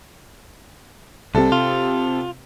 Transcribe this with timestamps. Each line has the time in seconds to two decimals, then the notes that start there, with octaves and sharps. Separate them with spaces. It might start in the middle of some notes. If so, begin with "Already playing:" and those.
1.35 C2 C3 A4
1.52 F4